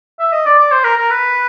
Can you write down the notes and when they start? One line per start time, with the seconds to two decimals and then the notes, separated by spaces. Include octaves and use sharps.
0.19 E5
0.33 D#5
0.46 D5
0.59 D5
0.72 C5
0.84 A#4
0.98 A#4
1.11 B4